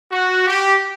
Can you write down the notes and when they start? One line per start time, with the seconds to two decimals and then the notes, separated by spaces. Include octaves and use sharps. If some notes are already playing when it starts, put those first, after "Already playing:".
0.12 F#4
0.46 G4